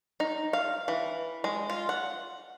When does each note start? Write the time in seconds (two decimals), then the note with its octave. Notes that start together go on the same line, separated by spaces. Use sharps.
0.20 D#4
0.53 F5
0.88 E3
1.44 G#3
1.70 F4
1.89 F#5